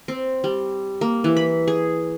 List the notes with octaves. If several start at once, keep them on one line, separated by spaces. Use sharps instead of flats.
C4
G3
A#3
E3
B5
G#4